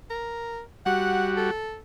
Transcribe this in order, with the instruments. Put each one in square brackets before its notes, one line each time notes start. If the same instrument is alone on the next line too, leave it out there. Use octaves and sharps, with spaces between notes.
[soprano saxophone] A#4
[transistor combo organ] G3 F#4 [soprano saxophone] F#5
[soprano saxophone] A4